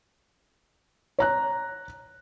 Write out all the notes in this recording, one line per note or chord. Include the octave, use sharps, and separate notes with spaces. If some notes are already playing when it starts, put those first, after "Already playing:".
C#5 A#5 F#6